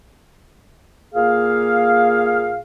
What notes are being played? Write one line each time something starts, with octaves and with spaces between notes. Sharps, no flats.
A#2 A#3 G#4 F5